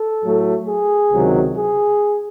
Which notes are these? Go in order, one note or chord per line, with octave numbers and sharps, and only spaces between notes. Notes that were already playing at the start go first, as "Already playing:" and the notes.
Already playing: A4
A2 F#3 A3
G#4
C#2 C3 D#3 F#3
G#4